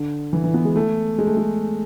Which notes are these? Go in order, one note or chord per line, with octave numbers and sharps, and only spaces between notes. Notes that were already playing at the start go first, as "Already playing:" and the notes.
Already playing: D3
E3
E3
B3
G#3
A3
G#3
A3
G#3